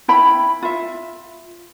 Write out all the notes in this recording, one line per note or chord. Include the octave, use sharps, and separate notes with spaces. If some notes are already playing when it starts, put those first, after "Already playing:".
E4 G5 B5
F4 E5